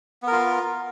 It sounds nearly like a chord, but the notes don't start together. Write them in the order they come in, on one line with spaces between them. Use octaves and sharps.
B3 A#4 F4